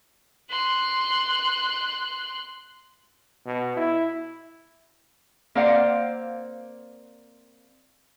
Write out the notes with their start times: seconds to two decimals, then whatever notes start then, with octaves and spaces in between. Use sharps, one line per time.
0.50 C6 F#6
3.46 B2
3.77 E4
5.55 A#3 C4 C5 D5 F5 F#5